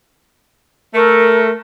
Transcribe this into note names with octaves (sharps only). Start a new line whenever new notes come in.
A3 A#4